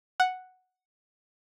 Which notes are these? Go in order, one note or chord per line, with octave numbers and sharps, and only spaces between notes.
F#5